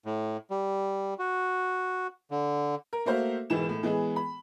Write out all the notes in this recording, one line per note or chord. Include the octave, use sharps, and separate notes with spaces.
A2
G3
F#4
D3
A#4
A3 A#3 F#4 C5 E5 F5
E1 G#2 E3 E7
A2
E3 G#3 B3 G#4
B5